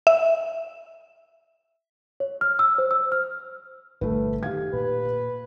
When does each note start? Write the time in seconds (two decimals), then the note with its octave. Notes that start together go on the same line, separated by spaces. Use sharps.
0.07 E5
2.20 C#5
2.41 F6
2.59 E6
2.78 C5
2.91 E6
3.12 F6
4.01 G1 A#2 A3 B4
4.43 D#3 G4 F5 G#6
4.73 A#2 B4